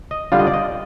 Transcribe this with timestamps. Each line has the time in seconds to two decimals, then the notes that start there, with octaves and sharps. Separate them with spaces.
0.11 D#5
0.32 D3 G3 D4 F4 F5
0.39 D#5
0.47 D5
0.54 D#5